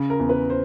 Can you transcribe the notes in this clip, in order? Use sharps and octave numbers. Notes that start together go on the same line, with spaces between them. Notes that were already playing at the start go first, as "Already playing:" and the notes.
Already playing: C#3
A#4
E2
B4
C5